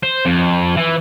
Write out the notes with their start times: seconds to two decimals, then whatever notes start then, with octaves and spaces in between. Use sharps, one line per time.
0.03 C5
0.26 F2
0.77 E3